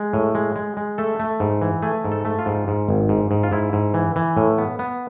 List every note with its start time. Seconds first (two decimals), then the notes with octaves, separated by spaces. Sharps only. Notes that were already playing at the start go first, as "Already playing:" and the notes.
Already playing: G#3
0.13 A2
0.35 G#3
0.56 G#3
0.77 G#3
0.98 A3 A4
1.20 A3
1.40 G#2
1.62 E3
1.82 A3 G#4
2.04 G#2
2.12 A4
2.25 A3
2.39 F4
2.46 G#2
2.68 G#2
2.89 G#1
3.09 G#2
3.31 G#2
3.43 F4
3.52 G#2 E4
3.73 G#2
3.94 E3
4.16 E3
4.37 A2
4.58 B3
4.79 B3